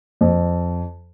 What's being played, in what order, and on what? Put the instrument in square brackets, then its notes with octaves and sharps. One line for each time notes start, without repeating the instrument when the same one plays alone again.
[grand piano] F2